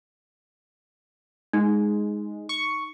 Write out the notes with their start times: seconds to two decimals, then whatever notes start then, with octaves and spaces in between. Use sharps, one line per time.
1.53 G#3 D#4
2.49 C#6